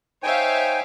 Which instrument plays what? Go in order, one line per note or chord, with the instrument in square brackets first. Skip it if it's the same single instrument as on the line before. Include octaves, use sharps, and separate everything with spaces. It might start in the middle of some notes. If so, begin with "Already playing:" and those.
[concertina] D#4 G5 G#5 [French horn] C5 [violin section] C#5 E5 F5